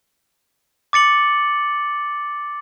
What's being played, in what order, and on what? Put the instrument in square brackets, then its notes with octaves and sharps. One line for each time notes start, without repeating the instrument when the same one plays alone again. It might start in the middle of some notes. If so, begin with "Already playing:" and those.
[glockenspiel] D6 A6 C#7 F#7